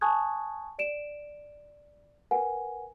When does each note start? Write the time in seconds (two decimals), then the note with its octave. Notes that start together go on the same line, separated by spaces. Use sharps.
0.01 G#5 A5 C#6 D#6 F#6 G#6
0.79 D5 D7 E7
2.31 A#4 B4 F#5 G#5